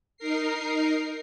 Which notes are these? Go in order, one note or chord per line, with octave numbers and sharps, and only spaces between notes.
D#4 A#4 C7